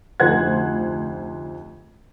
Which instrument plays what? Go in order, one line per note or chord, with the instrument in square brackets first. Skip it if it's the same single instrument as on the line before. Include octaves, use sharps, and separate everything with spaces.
[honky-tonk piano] F1 D2 F3 C5 F#5 G#6